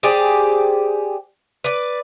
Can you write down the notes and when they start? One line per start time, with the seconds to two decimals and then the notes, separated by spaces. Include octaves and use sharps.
0.03 G4 G#4 C5 D5
1.64 B4 D5